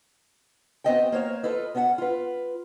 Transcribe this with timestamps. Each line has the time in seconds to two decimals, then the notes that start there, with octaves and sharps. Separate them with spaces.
0.84 B3 C4 F#4 D#5 F#5 G5
1.12 A#3 C5 C#5 F5
1.43 F4 A4 B4 D#5
1.75 B3 C#4 F#4 E5 F#5
1.98 F4 B4